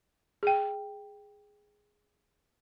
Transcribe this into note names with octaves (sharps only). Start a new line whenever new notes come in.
G#4 G5